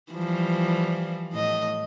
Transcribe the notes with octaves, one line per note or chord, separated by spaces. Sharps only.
E3 F3 G3
A2 D#5